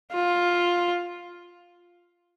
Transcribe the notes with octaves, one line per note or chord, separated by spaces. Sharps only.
F4